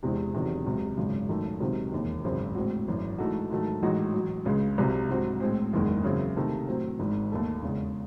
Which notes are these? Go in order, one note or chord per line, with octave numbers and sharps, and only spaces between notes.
E2 C3 E3 G#3 C4
E1 E2 C3 D#3 F#3
C#2 C3 F#3
G#1 F#2 C#3 G#3
F#2 D#3 A3
C#2 C3 D#3 F#3 C4
E1 D#2 D#3
G#1 F#2 C#3 G#3 C4
A2 G#3 C4 F#4
G#1 F#2 E3
G#2 E3 A3 D#4 F#4
G#2 D#3 F#3 A3
A1 A2 G#3 D#4 F#4
A1 A2 F#3
C#2 C#3 G#3
C2 C3 F#3
G#2 F#3 C4 F#4
A2 G#3 C4
F#1 E2 D#3 G#3
F#2 C#3 E3 C4 E4
C3 D#3 A3
A2 F#3 C4
G#1 G#2 D#3
D#2 D#3 A3
E2 C#3 G#3